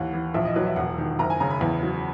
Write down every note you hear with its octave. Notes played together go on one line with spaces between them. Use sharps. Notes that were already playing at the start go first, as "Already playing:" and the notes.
Already playing: D#2 E3 F#5
E3
A#1 E5
D#5
F#3 B4
E5
E1 F#5
D#3
F#1 A#5
G#5
C#3 A#5
B5
E2
F#3